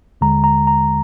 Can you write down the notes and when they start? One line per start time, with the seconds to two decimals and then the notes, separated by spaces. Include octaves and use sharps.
0.21 D#2 D3 G#3 A#5
0.44 A#5
0.67 A#5